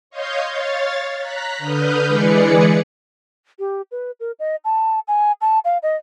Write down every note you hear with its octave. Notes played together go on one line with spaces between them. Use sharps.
C#5 D#5 F5 C6 G6
C#5 F5 A6
A#5 F#6 B6
D3 B4 D#6 F6 G6
E3 G#3 G#4 B4 D5 C#7
G4
B4
A#4
D#5
A5
G#5
A5
F5
D#5